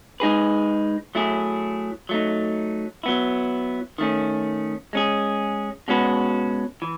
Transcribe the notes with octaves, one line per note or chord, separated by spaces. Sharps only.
G#3 D#4 G#4 B4
F#3 A3 E4 G#4
F#3 A3 D#4
F#3 B3 E4
D#3 A3 C#4
G#3 C#4 G#4
B2 G#3 C#4 F#4 B4
E3